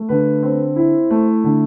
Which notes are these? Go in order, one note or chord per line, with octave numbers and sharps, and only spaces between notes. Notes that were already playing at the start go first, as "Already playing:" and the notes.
Already playing: A3
D3 B4
C4
E4
A3
D3